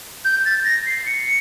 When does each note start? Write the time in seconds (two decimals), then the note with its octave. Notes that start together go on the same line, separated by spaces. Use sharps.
0.25 G6
0.45 A6
0.65 A#6
0.86 C7
1.06 C#7